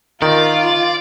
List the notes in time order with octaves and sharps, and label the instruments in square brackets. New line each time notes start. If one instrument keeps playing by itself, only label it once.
[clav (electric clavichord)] D#3 [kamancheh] F4 [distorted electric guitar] D5